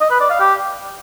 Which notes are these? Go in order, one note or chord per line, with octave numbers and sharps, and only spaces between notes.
D#5
B4
D5
F5
G4